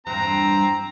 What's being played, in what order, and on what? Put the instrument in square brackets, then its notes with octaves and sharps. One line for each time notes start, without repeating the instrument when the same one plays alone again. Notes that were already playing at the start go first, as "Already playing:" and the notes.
[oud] E2 G2 [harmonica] C4 A#5